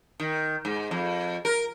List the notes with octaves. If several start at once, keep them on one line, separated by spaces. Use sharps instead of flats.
D#3
G#2
F2
A#4